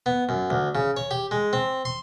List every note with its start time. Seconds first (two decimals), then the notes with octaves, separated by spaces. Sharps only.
0.06 B3
0.29 F#2
0.50 D2
0.75 C#3
0.97 C#5
1.11 G4
1.31 G#3
1.53 C4
1.85 C6